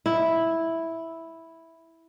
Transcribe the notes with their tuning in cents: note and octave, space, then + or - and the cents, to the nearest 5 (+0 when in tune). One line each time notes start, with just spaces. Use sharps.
E4 -5